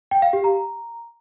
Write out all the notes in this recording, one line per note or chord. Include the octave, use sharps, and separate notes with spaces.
G5
F5
G4
A#5